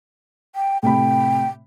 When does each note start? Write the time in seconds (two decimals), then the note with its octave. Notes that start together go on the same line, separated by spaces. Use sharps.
0.56 G5
0.83 A2 C3 G5 B5